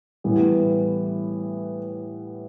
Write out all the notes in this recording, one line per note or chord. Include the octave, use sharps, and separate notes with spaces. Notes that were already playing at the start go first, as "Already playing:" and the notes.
A2 E3 G3 B3